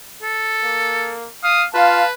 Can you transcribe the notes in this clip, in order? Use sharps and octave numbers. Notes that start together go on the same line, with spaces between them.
A4
A#3
F5 D#6
F4 B4 F5 A5